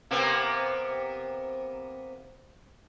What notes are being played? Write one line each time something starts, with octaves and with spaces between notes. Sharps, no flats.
C3 A#3 B3